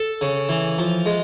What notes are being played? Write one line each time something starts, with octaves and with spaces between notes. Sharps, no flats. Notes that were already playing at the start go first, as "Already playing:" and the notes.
Already playing: A4
C#3
E3
F3
G#3